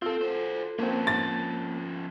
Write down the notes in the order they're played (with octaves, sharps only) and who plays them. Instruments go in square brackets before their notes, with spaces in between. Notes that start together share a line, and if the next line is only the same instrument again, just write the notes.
[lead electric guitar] C4 [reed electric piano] F4 A4
[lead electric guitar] F#4 C5
[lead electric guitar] F3 C#4 [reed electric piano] A#3 C4
[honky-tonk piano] A6